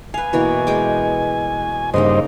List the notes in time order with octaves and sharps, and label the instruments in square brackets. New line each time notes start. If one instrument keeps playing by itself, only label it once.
[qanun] B4 F5 [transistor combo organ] G#5
[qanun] B2 E3 A#3
G#3 G5 D6
[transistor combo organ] G2 C5 D#5 [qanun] C#3 A#3 D#4